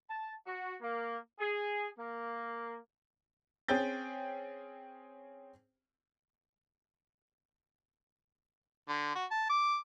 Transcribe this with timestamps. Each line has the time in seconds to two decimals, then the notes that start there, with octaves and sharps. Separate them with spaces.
0.10 A5
0.47 F#4
0.82 A#3
1.39 G#4
1.98 A#3
3.68 C4 C#4 G#4 G5 G6 A6
8.89 D3
9.15 F#4
9.31 A5
9.49 D6